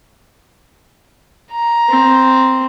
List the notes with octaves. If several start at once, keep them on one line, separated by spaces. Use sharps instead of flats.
A#5
C4